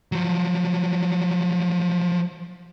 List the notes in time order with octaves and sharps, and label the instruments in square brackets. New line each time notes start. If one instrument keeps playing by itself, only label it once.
[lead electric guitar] F3 F#3